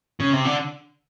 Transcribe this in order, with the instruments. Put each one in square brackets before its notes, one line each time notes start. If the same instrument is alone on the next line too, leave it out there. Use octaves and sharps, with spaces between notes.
[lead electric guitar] C#3
C3
D3